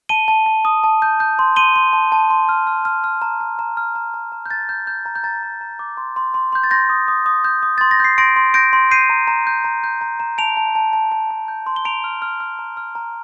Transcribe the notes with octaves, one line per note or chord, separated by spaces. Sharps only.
A5 D#7 G7
A5
A5
D#6
A5
G6
G6
C6
C6 D#7 G7
C6
A5
A5
C6
F6
F6
F6
F6
A#5
A#5
A#5
F6
A#5
A#5
A#5
G6
A#5 A6
G6
G6
A#5
G6
A#5 A6
A#5
A#5
D6
C6
C6
C6
C6 G6
A6
C6 G6 A#6
D#6
D#6
D#6
G6
D#6
C6 A6
A#6
G6 C7
C6 A#6 D7
C6
G6 A#6 D7
C6
G6 C7 D#7
A#5
A#5
G6
A#5
G6
A#5
A#5
A5 D7 F7
A5
A5
A5
A5
A5
G6
C6
G7
A#5 D7 F7
F6
F6
F6
A#5
F6
A#5